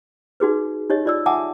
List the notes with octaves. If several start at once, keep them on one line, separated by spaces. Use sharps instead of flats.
D#4 F#4 G#4 B4
D#4 G4 C#5 D#5
F4 D5 E6
E5 F#5 G#5 A5 D6 D#6